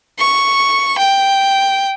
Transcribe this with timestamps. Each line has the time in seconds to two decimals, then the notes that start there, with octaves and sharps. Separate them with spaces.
0.20 C#6
0.99 G5